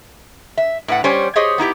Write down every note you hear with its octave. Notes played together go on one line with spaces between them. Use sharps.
E5
A2 B4 F#5
G3 C#4 C5 C#5 G#5
G4 G#4 C5 C#5 D#5
B3 D#4 E4 G4